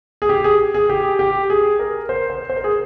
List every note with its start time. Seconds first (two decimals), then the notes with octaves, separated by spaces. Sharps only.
0.22 G#4
0.29 G4
0.44 G#4
0.74 G#4
0.89 G4
1.19 G4
1.50 G#4
1.79 A#4
2.09 C5
2.30 C5
2.50 C5
2.56 A#4
2.64 G#4